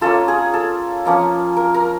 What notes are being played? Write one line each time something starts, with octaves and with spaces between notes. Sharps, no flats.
A#3 C#4 F4 A4
G#4
A4
F3 A#3 C#4
A#4
A#4